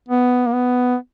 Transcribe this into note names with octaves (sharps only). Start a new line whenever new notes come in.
B3
A#3
B3